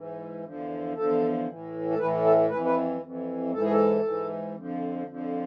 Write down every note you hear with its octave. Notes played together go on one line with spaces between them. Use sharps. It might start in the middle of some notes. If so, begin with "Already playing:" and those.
Already playing: G#2 E3
E2 D3 F3
E2 D3 F3 A4
A2 E3
A4
A2 E3 B4
A4
F2 E3 B4
B4
F2 E3
G#2 E3 A4
G#4
A4
G#2 E3
F2 D3 F3
F2 D3 F3